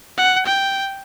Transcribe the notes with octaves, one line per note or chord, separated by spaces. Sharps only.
F#5
G5